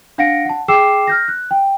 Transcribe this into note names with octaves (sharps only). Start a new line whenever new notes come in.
D4 F5 F#5 A#6 C#7 D7
F#5 A5
G#4 G5 D6 E6 C7 E7
F6 G6 A#6
F#6
G5